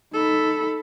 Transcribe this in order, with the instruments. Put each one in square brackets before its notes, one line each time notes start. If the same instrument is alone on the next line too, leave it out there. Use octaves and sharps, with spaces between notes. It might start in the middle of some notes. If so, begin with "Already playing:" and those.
[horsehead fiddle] D#4 B5 [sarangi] A4